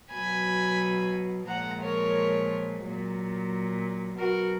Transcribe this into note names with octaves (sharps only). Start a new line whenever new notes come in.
B2 F#3 G#5 B5
A#2 F3 G#3 F#5 A#5
A#4 C#5
A#2 F#3
B2 F#3 F#4 A#4